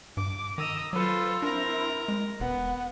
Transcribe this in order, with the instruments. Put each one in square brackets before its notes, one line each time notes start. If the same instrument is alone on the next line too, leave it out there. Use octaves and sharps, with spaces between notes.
[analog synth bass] G2 [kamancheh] D6
[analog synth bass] D#3 [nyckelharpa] D#5 A#5 [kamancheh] D#6 E6
[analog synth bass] F#3 [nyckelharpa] F4 A4 [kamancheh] B4 C5
[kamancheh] C4 E4 [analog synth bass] D4 [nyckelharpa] A#4 A#5
[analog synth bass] G#3
[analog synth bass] E1 [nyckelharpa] B3 [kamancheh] F#5